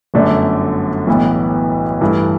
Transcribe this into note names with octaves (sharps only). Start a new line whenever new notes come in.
G1 F#2 D3 A3 D4
B1 A2 E3 B3
G2 E3 A3